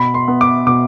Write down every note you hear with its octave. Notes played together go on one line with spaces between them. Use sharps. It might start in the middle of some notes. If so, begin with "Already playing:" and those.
Already playing: B2 B5
C6
B3
D6
B2 D6